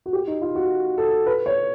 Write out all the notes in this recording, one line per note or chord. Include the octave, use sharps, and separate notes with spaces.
F#4
G4
D#4
F4
F#4
A4
B4
C#5